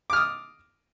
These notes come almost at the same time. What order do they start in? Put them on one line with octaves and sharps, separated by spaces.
D6 F6 D#6